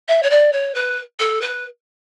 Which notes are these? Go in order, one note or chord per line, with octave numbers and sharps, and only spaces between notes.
E5
C#5
D5
C#5
B4
A4
B4